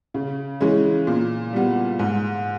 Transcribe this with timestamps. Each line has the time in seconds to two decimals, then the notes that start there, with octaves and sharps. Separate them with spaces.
0.14 C#3
0.61 E3 G#3 C#4
1.07 A#2
1.53 G3 B3
1.99 G#2